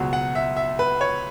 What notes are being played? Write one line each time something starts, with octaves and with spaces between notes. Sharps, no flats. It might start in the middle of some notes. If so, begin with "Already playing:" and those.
Already playing: C#2 B2 F#3
F#5
E5
E5
B4
C#5